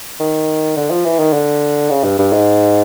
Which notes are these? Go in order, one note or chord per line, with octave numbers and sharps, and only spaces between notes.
D#3
D3
F3
E3
D#3
D3
C#3
G2
G2
G#2